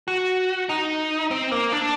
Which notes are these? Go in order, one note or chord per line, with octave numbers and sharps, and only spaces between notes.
F#4
D#4
C4
A#3
D4